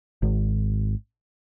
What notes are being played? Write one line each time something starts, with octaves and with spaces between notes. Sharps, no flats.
G#1